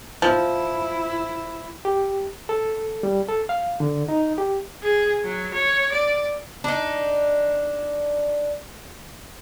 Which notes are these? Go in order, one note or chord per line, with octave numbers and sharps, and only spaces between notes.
F3 E4
G4
A4
G3
A4
F5
D3
D#4
G4
G#4
F#3
C#5
D5
D4 D#4